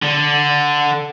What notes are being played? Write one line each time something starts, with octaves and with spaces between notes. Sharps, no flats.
D3